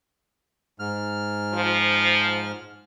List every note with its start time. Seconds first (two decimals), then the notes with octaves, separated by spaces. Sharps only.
0.79 G#2 F6
1.53 F3